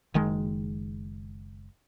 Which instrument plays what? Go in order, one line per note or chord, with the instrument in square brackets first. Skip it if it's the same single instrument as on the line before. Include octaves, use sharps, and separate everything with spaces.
[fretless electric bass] F#1 D#3 G#3